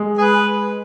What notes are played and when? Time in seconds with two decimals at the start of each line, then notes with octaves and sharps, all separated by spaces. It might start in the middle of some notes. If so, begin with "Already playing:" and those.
Already playing: G#3
0.18 G#4 B4